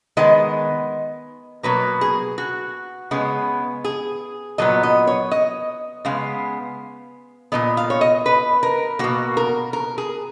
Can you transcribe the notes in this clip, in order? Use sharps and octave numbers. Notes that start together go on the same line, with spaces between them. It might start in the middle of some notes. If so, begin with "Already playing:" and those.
D#3 G#3 B3 D#5
B2 F#3 A#3 B4
G#4
F#4
C#3 G#3 B3
G#4
A#2 F#3 B3 D#5
D#5
C#5
D#5
C#3 G#3 B3 F5
A#2 F#3 B3 D#5
F5
C#5
D#5
B4
A#4
B2 A#3 F#4
A#4
A#4
G#4